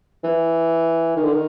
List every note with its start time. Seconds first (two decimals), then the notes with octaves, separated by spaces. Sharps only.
0.24 E3
1.16 D#3
1.24 D3
1.33 D#3